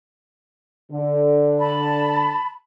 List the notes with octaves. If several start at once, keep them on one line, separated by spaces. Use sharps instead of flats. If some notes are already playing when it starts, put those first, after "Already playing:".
D3
A5 B5